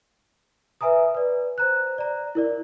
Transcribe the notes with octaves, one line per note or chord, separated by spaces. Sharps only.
B4 E5 G#5 A#5 D#6
B4 D5
C5 A#5 F#6
D5 A#5
E4 A#4 D5